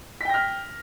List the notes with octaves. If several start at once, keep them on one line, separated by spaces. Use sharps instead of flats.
G5 F6 A#6 B6